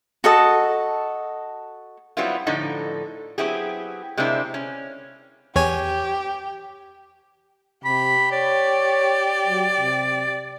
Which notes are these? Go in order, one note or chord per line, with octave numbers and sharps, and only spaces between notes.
F#4 A4 D#5 A5
F#3 G3 B3 C4 E4 F4
A2 D3 F3 D#4 A4
F#3 B3 C4 E4 G4 G#4
C3 G#3 A#3 C4 D4 E4
C#4
E2 G4 C#5 G#5
C3 G4 B5
C#5 D5
F#3
C3